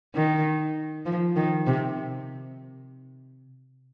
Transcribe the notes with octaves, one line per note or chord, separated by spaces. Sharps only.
D#3
F3
D#3
C3